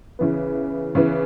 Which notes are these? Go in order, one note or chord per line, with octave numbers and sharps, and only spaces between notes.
C#3 E3 B3
C#3 E3 B3